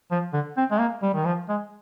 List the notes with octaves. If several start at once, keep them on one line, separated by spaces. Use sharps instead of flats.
F3
D3
C4
G#3
A#3
G3
D#3
F3
G#3